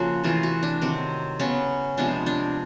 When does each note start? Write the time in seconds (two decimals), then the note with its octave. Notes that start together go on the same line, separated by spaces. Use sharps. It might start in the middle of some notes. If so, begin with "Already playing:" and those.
Already playing: C#3 F3 A#3 F#4
0.24 C3 E3 A3 F4
0.43 F#4
0.63 D4
0.81 C3 D#3 F#3 C4
1.39 C#3 F#3 B3 C#4
1.97 C3 F3 G#3 B3 D4
2.26 D4